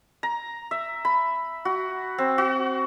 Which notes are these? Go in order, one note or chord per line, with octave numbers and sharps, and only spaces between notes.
A#5
E5
B5
F#4
C4
F#4